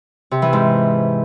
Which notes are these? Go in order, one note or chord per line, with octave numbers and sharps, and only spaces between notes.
C3
E3
G#2